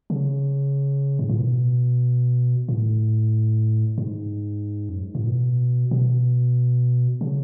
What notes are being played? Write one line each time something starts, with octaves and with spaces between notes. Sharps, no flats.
C#3
G#2
A2
B2
A2
G#2
F#2
G#2
A2
B2
B2
C#3